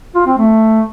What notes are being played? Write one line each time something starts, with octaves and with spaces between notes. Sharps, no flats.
F4
C4
A3